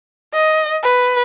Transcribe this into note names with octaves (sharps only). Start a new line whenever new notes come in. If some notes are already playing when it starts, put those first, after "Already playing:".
D#5
B4